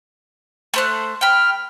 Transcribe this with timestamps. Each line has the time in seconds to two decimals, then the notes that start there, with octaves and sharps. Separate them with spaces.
0.74 A3 C5 F#6
1.21 G5 B5 F6